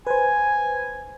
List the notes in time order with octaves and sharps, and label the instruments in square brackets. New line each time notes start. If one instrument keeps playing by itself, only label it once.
[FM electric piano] B4 C5 [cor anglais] G#5